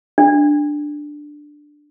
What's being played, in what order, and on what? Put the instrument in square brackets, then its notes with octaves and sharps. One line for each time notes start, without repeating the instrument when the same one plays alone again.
[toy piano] D4